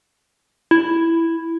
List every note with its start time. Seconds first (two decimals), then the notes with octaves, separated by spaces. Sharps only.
0.71 E4